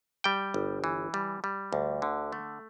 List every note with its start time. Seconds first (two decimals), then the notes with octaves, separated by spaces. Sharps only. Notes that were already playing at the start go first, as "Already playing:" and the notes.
0.24 G3 G5
0.54 G1
0.84 E3
1.14 G3
1.44 G3
1.73 D2
2.02 D3
2.32 A3